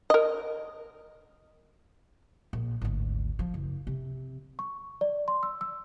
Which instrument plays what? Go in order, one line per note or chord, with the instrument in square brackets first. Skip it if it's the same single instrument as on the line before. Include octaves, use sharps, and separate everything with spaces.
[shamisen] A#4 D#5
[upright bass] A#1
G#1 D2
F3
F#1
C3
[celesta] C#6
D5
C6
E6
E6